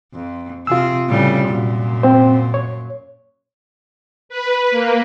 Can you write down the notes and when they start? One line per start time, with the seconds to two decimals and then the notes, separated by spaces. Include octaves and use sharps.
0.14 F2
0.67 C3 F3 F4 G#4 E6
1.09 A2 C#3 G3
1.48 F#2 A#2
2.03 C4 C5
2.54 C#5
4.29 B4
4.71 A#3